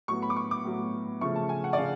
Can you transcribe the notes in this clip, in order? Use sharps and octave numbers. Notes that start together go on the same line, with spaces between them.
A2 F#3 B3 C#6
B5
D6
C#6
D6
A2 F#3 B3
C#3 F3 A3 C#6
A5
G#5
F#5
D5
C#3 F5